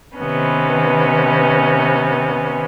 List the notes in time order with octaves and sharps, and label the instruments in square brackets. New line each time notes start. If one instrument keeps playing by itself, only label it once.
[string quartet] C3 D#3 B3 C#4 B4